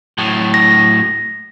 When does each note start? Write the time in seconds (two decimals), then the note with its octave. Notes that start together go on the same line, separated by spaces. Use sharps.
0.18 A2 F#3
0.54 A#6